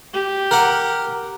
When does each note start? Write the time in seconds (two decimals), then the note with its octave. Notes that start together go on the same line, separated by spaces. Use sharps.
0.14 G4
0.51 A#4 F#5 D6